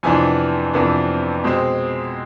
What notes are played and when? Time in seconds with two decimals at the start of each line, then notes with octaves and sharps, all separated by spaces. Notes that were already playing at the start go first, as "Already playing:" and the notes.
0.03 F2 C3 E3 B3 D4 G#5
0.74 F2 C3 E3 B3 D4
1.44 B2 G#3 C4